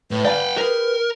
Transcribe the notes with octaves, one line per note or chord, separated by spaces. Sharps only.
A2 B4
D5 F5 G5 G#5 B5
G4 G#4 A#4